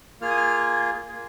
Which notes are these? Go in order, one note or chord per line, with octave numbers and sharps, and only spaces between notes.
A#3 F4 G#4 F6
D#6
F6
A#3 F4 G#4